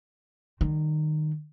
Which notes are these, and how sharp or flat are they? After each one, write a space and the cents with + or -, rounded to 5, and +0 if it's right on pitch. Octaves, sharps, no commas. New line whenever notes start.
D#3 -20 G3 +0